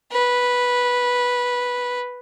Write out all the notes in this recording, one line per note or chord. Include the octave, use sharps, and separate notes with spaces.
B4